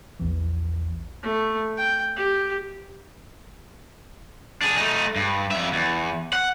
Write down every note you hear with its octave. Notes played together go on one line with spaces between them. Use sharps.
A#1 E2 E3
A3
G5
G4
D4 G#4
A3 D#4
G2
F2 E5
E2
F#5